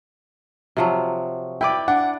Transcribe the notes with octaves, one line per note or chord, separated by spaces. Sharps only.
C3 F3 F#3
E4 B4 D5 G5 D6
D4 F#5